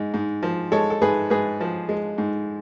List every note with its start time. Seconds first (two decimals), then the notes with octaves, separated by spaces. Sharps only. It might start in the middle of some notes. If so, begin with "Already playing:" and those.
Already playing: G#2 G#3
0.14 G#2
0.43 F3
0.72 G#3 A4 C#5
0.90 A4
1.02 G#2 G#4 B4
1.30 G#2 G#4 B4
1.61 F3
1.89 G#3
2.18 G#2